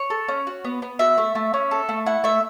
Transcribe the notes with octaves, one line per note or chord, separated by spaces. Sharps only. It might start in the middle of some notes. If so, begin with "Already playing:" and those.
Already playing: C#5
A4
C#4
F#4
B3
B3
F#4 E5
A3
A3
C#4
A4
A3
E4 F#5
A3 E5